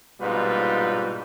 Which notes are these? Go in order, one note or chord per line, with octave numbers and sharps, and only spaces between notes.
A#1 G#2 B2 G3 F4 B4